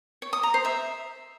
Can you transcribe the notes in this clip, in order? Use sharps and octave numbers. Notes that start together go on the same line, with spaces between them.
C#5
D#6
A#5
C5
E5